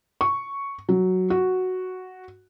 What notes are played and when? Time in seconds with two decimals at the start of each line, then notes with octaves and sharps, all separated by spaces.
0.21 C#6
0.89 F#3
1.30 F#4